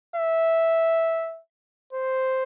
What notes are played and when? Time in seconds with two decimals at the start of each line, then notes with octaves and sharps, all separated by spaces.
0.16 E5
1.93 C5